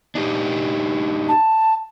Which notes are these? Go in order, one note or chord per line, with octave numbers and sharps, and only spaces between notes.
D4 D#4 G4
A5